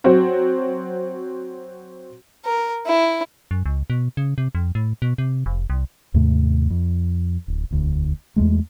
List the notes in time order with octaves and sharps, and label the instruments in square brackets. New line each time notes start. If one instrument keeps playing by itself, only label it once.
[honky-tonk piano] F#3 C4 F#4
[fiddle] A#4
E4
[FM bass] F#2
C#2
B2
C#3
C3
F2
A2
B2
C3
F1
C2
[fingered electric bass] D#2 G#2 C3 A3
F2
D1
E1 D2
E2 G2 G#3 A3